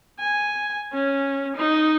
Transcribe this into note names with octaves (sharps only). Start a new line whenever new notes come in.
G#5
C#4
D#4